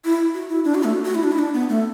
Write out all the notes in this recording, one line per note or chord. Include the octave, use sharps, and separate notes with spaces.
E4
F#4
E4
D4
F#4
A3
F#4
E4
D4
E4
D4
B3
A3